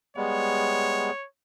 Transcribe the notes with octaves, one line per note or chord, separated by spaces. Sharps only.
G3 G#3 B3 C#5